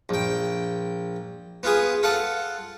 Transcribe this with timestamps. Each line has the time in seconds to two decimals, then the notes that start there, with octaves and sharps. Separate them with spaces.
0.09 A#1 G5
1.63 B3 F4 G#4
2.03 F4 A4 F#5